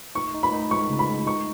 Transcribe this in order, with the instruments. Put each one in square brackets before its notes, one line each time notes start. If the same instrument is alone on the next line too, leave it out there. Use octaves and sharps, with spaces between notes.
[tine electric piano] D#4 [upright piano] C#6
[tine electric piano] D#4
[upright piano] B5
[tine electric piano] D#4
[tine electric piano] G#3 [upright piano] C#6
[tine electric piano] C#3
[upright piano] B5
[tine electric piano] G#3
[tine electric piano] D#4 [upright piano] C#6